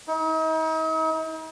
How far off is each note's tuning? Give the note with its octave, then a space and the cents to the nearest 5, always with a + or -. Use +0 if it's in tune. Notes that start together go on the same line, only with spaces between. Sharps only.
D#4 +40